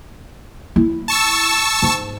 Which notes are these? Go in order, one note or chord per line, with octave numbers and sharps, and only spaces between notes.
E4
A5 C#6 E6
G#2